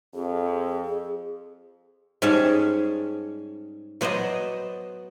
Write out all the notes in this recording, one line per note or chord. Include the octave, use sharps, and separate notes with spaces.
F2 G#4
G#2 G3 C#4 G#4 C#5 A5
F#3 B3 C5 D5 D#5